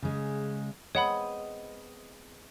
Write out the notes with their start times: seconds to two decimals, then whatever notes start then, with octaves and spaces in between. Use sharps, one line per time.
0.02 C#3 G#3
0.95 G#3 B3 C4 C#5 D#5 F#5 B5